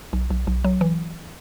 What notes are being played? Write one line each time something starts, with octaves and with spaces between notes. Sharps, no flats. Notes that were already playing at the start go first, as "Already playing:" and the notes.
B1
B1
B1
F#3
E3